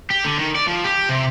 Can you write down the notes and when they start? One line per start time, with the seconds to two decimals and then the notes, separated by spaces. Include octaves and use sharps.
0.10 G4
0.24 D3
0.38 D#3
0.55 D5
0.67 F3
0.84 G4
1.09 C3